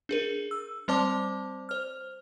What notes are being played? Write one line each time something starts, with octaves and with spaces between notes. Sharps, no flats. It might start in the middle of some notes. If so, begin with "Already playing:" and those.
D4 G#4 A#4
E6
G3 C4 C5 D5 A5 D6
C5 F6